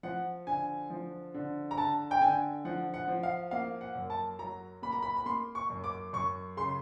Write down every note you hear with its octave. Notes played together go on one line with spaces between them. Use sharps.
F3 F#5
D3 G#5
F3
D3
A#5
D3 A5
G5
D3 G#5
F3 F#5
F#5
F3
F5
A#3 F5
F#5
F#2
A5
F#3 A#5
A#3 B5
A#5
B5
B5
A#3 C6
C#6
F#2
D6
F#2 C#6
C#3 C6